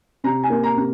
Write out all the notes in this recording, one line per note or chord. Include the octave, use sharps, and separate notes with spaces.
C3 A#5
G#5
A#3
A#5
C3